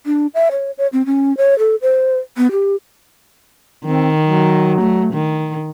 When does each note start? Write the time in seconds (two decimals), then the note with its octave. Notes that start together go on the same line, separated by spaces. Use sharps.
0.06 D4
0.34 E5
0.52 C#5
0.78 C#5
0.93 C4
1.06 C#4
1.37 C#5
1.59 A4
1.82 C5
2.37 B3
2.51 G4
3.85 D#3 C4
4.23 F#3
4.81 A3
5.14 D#3